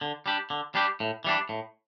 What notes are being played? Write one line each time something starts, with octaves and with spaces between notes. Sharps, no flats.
D3
G3 D4 G4
D3
G3 D4 G4
A2
E3 G3 D4
A2